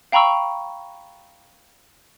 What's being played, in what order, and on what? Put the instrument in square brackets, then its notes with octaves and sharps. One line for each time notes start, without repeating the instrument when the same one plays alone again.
[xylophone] F5 G5 A#5 B5 C#6 E6